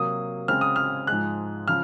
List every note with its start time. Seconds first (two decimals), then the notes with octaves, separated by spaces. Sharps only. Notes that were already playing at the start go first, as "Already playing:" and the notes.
Already playing: C3 F#3 A#3 D#6
0.48 C#3 G#3 C4 F6
0.61 D#6
0.76 F6
1.07 G#2 F3 G#3 F#6
1.68 C#3 F3 F6